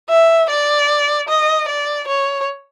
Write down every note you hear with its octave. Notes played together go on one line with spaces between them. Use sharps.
E5
D5
D#5
D5
C#5